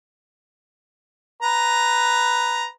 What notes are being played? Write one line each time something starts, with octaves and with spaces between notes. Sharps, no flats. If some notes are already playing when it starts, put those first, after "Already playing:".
B4 A#5